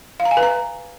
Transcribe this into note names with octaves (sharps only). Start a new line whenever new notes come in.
F5
A#5
G#5
B4
A#5